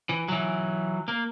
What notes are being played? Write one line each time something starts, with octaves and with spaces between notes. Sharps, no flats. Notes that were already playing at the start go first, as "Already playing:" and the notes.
E3
E3 F#3
A#3